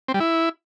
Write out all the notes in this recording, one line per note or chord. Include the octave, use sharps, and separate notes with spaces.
C4
G3
E4